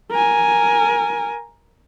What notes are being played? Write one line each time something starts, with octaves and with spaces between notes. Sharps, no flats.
A#4 G#5